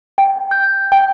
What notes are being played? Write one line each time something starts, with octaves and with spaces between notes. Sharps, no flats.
G5
G6
G5